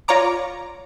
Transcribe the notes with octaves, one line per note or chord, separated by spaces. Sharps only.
F4 C#5 D5 A#5 D6